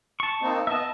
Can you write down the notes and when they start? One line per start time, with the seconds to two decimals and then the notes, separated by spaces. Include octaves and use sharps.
0.20 A5 C#6
0.42 A#3 C4 D#4
0.67 B3 D#5 E5 A5